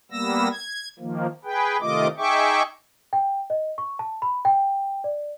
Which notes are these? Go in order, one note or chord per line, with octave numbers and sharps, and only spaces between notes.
G3 A#3 B3 E6 A#6
G#6
D#3 F3 A#3
G#4 B4 G5
C3 D#3 A3 F4 D#5 D6
D#4 G#4 E5 G5 C#6 D6
G5
D#5
C#6
A5
B5
G5
D5